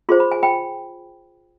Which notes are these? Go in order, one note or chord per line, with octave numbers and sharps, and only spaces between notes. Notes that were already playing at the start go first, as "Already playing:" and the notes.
F4 G#4 C5 C6
B5
G#5
G5 B5